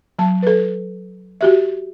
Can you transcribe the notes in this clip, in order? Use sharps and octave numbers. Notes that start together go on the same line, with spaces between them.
F#3 A5
A4 B4
F#4 G4 E5